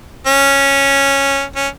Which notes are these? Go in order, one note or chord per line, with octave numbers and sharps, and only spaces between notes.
C#4
C#4